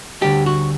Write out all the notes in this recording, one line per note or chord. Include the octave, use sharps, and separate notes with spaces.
D2 D3 G3 G4
F#4